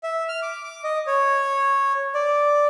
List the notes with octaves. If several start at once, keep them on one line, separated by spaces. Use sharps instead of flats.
E5
F6
D6
D6
D#5
C#5
D5